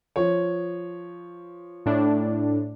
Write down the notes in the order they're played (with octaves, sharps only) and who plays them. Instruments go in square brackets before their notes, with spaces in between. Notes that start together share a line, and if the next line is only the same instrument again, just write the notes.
[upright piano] F3 C#5
[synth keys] A2 D4